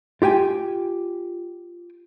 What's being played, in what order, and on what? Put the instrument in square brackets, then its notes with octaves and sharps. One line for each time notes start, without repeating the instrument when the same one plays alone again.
[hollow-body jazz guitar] F4 G4 G5 G#5